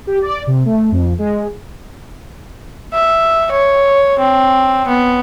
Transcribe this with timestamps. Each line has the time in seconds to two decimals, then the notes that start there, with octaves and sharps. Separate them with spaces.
0.07 G4
0.22 D5
0.47 C3
0.65 A3
0.91 F2
1.19 G#3
2.94 E5
3.52 C#5
4.19 C4
4.88 B3